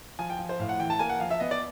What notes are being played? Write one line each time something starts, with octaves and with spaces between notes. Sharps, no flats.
F3 G#5
G5
F3
C5
A2 F5
F#5
E3 G5
A5
A#3 G#5
F#5
F3 F5
E5
B3 D#5
D5